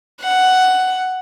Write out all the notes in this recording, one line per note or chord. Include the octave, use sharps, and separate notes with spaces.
F#5